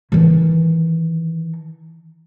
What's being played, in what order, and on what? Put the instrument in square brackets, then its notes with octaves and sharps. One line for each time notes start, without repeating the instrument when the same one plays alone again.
[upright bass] D#3 E3